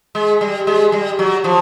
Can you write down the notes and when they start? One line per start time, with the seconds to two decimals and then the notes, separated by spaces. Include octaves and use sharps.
0.15 G#3
0.41 G3
0.67 G#3
0.92 G3
1.19 F#3
1.44 F3